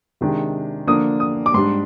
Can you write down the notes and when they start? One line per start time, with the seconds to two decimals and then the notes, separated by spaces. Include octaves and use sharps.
0.21 C3 D#3 G#3 D4
0.87 D3 F3 A#3 D4 D#6
1.20 D#6
1.46 D6
1.54 G#2 G3 D4 C6